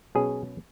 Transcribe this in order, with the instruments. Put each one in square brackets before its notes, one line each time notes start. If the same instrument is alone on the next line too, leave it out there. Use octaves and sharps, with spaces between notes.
[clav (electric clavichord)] B2 F#3 C#4 G#4